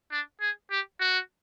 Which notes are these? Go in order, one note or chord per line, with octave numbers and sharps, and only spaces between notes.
D4
G#4
G4
F#4